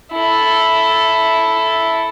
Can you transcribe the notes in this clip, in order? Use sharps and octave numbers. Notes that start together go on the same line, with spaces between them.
E4 A4